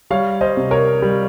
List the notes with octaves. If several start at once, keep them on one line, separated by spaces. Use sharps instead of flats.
G3 C#5 F5
C5 D#5
C3
A#4 C#5
G3